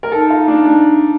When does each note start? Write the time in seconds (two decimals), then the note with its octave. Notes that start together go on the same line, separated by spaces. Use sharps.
0.03 A#4
0.12 D#4 A4
0.30 F4
0.48 D4
0.66 D4